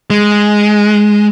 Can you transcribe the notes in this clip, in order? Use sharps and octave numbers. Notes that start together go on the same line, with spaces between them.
G#3